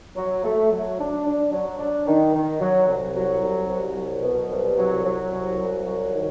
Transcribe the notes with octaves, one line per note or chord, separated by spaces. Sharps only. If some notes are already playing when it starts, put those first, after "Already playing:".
F#3
A3
F#3
D4
D4
F#3
D4
D#3
D#3
F#3
C2
F#3
C2
C2
F#3
B2
C2
F#3
F#3
C2
C2
F#3
D#3